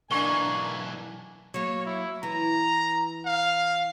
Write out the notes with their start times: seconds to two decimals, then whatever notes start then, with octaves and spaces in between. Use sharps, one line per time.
0.11 B1 E3 A#3 D4 G#5 C#6 G7
1.54 F#3 A#3 C#5
1.85 E4
2.23 E3 A#5
3.25 F5